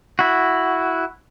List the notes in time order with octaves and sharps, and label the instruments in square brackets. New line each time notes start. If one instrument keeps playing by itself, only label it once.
[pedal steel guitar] E4 F#4